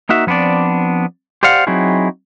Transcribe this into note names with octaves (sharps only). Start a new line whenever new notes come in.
A#3 D#4 F#4 E5
F3 B3 C4 D4 D5
G4 C5 D5 F5 F#5
F#3 C4 D#4 E4 F#4 G#4